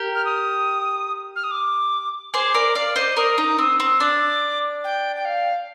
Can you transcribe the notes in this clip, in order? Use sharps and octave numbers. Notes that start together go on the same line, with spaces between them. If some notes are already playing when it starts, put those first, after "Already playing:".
Already playing: G4 A#4
F6
D#6
F6
D#6
D6
G#4 C5 D6
A#4 D5
D5 F5
C5 D#5
A#4 D5 D#6
D#4
C4
C4
D4 D6
G5
G5
F5